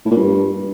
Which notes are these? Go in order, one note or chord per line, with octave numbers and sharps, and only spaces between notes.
A2
A#2
G2